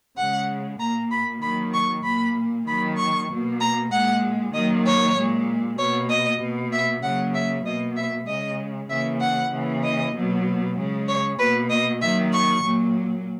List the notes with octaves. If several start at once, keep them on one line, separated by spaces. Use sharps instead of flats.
C#3 G#3 F#5
A#2 A#3 A#5
B5
D#3 F#3 A#3 B5
C#6
A#2 A#3 B5
D#3 F#3 A#3 B5
C#6
B2 A#3
A#5
A#2 G#3 F#5
D#3 F#3 A#3 D#5
C#5
A#2 G#3
B2 A#3 C#5
D#5
B2 A#3
E5
C#3 F#3 A#3 F#5
E5
B2 A#3 D#5
E5
C#3 G#3 D#5
C#3 E3 A#3 E5
F#5
C#3 E3 A#3
D#5
B2 F#3 A#3
C#3 G#3
C#5
B2 A#3 B4
D#5
D#3 F#3 A#3 E5
C#6
A#2 F#3 A#3